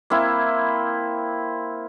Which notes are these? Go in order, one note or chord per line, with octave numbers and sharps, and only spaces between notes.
A#3 C4 E4